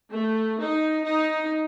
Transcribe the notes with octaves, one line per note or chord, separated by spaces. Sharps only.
A3
D#4
D#4